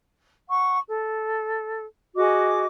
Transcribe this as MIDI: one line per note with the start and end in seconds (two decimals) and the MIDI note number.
0.49 0.78 78
0.49 0.78 85
0.88 1.85 69
2.16 2.66 66
2.16 2.66 68
2.16 2.66 75
2.16 2.66 86